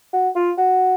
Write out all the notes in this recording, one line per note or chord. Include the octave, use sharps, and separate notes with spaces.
F#4
F4
F#4